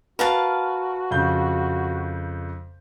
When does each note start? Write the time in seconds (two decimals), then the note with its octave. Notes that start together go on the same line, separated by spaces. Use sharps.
0.19 F#4 A#4 B4 F5 A5
1.11 F2 C#3 G6